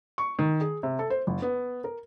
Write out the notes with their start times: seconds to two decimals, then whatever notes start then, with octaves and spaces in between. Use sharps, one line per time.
0.18 C#6
0.39 D#3
0.61 G#4
0.83 C3
0.99 A4
1.10 C5
1.27 F#1
1.42 B3
1.84 A#4